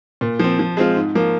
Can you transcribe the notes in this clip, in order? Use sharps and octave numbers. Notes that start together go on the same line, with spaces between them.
A#2
F3 C4
F3
G#3 C4 F4
G#2
F3 A#3